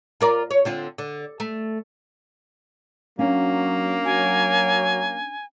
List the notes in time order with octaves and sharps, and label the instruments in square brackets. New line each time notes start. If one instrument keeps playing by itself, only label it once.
[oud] F4 A#4 D5
C#5
D3 C4 F4
D3
A3
[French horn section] F#3 [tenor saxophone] A#3 [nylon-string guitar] C#4 D4 F5
[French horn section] F#3 [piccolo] G#5